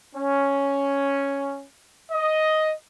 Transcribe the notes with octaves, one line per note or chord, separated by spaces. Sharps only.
C#4
D#5